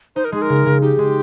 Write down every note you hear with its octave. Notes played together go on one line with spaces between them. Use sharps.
D#4 C5
A#4
G#3 G#4
A#4
C#3
C#3
D#4 G4
G#3